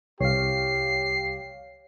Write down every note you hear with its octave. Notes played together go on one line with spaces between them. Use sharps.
C2 G4 C#5 F5 C7